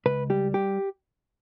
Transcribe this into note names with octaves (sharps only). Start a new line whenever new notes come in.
C#2 B4
G3 G4
G4